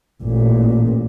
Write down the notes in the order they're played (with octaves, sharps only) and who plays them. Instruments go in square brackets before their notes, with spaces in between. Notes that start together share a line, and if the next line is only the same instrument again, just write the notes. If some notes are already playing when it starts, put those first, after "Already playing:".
[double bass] A1 A#2